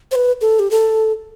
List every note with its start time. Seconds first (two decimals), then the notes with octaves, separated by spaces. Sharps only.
0.11 C5
0.15 B4
0.41 A4
0.59 G4
0.71 A4